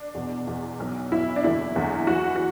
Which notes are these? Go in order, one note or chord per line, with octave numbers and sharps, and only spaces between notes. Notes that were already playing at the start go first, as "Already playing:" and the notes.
Already playing: D4
E2 B2
E2 B2
B1 B2
B1 B2 E4
D4
F#1 E2 D3 E4
F#1 E2 D3
E2 E3 F#4
F#4